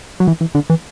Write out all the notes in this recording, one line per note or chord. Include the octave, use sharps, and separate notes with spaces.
F#3
E3
E3
D3
E3